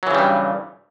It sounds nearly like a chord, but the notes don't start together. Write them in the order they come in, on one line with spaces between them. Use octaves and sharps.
F#3 E3 C#3 G3 G2